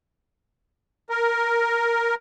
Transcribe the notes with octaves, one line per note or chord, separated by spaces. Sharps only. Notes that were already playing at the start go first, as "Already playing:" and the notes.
A#4